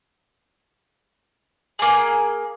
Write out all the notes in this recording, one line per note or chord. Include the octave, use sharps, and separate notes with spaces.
A#3 G#4